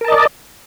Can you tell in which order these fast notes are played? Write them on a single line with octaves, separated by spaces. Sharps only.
A#4 A5 D#5 D5